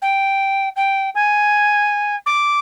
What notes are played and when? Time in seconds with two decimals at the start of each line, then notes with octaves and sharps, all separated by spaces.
0.02 G5
0.76 G5
1.15 G#5
2.26 D6